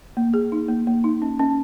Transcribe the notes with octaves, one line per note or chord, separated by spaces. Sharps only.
A#3
G#4
D#4
A#3
A#3
D#4
C#4
C#4